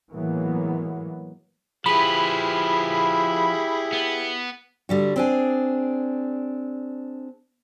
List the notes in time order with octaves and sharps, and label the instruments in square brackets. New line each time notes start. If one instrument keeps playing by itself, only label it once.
[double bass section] A2 E3 F#3 G#3 A#3 B3
[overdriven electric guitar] F3 B4 [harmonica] E4 G4 G#4 [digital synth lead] B5
[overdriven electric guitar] B3
[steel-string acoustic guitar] D3 G3 F#4
C4 D4 G#4